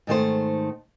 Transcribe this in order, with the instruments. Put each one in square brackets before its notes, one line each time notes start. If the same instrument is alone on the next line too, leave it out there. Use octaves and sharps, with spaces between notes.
[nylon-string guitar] G#2 D#3 A3 C5